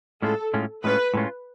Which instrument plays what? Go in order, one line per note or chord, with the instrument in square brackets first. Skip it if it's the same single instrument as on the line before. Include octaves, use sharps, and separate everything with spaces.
[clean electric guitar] A2 G#3 C#4 F4 [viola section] A4
[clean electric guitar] A2 G#3 C#4 F4
[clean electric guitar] A2 G#3 C#4 F4 [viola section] B4
[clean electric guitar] A2 G#3 C#4 F4